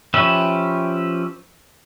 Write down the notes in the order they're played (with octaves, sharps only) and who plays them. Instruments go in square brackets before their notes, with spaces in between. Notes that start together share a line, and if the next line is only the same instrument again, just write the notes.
[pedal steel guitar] F3 C#4 G4 B4 E5